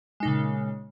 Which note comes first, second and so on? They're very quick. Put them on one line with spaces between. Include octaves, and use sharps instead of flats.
G#3 D#4 A#2 C#3